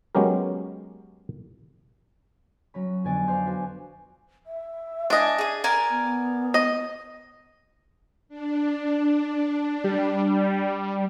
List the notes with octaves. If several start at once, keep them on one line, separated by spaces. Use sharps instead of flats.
F#3 G#3 B3 C#4 G4 A#4
F#3 C#4 B5
F2 D3 B3 G#5 A6 D7
C5 D5 F5 C6 G6
F#4 B4 D5 G#5
E5
D4 D#5 G#5 D6
G#4 D#6
A#4 D5 G#5
B3
D#5
D4
G3